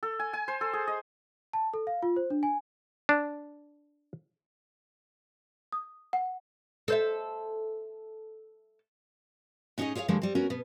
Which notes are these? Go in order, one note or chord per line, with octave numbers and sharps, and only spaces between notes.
A4
G#5
G#5
C5
A4
G#4
D#5
A5
A4
F5
F4
C5
D4
G#5
D4
D#6
F#5
A4 C5 E5
A2 C#4 D#4 F#4 G#4 D#5
F4 G#4 C#5 D#5 F5
D3 D#3 F3 G3 G#3 A#3
G3 C4
B3 C#4 F#4 A#4
B2 B3